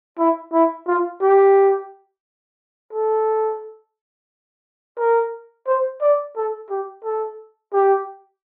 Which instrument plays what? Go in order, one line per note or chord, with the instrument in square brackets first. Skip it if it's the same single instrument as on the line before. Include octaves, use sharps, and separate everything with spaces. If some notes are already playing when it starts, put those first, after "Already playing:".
[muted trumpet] E4
E4
F4
G4
A4
A#4
C5
D5
A4
G4
A4
G4